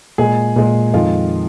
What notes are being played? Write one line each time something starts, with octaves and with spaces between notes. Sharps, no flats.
A#2 G#3 G#4
A#2 G#3
F2 D#3 G#3 F4